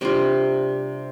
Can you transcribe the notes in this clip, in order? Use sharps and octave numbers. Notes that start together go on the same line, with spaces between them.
C3 G3 D4 F4